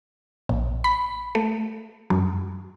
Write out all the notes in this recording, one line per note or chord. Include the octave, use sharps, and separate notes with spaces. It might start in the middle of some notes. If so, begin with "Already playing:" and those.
A#1
B5
A3
F#2